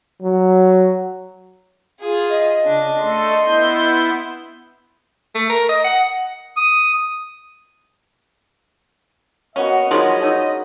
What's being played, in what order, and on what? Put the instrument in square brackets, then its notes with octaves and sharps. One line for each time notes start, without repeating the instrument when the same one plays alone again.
[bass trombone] F#3
[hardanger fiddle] F4 G#4
[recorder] D#5
[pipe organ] C#3 [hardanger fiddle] D4
[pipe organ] A3 A4 [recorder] D#5 [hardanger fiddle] C6
[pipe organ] B3 E4 G6
[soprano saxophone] A3
A#4
D#5
F#5
[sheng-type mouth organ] D#6
[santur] A#3 B3 F#4 [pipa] C#4 [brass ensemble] D#5
[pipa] F3 F#3 C#4 [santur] G#3 A#4 B5 [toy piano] D#4 G#4
[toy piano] D#4 C#5 E6